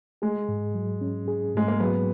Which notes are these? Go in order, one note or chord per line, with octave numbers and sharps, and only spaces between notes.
G#3 G#4
G#2
F#3
C#4
G#4
G#2 G#3
A#3
F#3 B3